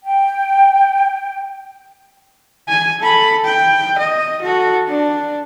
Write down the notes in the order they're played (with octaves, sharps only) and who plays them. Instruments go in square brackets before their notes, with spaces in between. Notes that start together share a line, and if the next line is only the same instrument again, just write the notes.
[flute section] G5
[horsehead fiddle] G#5
A4 B5
G5
D#5
F#4 A4
D4